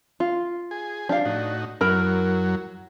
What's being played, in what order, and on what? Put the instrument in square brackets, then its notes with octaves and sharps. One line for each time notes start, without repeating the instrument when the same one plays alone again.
[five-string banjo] F4
[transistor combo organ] G#4
[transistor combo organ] F3 G4 [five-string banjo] D4 F5
[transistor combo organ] A2 D#4 F#4
[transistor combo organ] F#2 F#3 [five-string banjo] E4 A#4